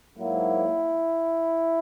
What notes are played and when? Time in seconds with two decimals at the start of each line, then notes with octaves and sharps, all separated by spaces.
0.18 G#2 F#3 A#3 E4